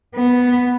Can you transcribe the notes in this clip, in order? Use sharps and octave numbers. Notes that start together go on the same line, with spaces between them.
B3